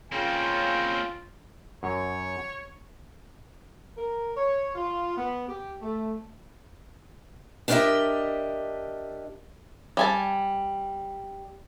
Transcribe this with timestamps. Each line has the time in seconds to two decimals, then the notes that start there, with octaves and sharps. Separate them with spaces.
0.12 C#3 A#3 C4 C#4 F4 G5
1.83 F#2 C#5
3.98 A#4
4.35 C#5
4.75 F4
5.17 B3
5.48 G4
5.82 A3
7.68 D4 G4 A#4 C#5 D#5 E5
9.97 G3 G#5 A5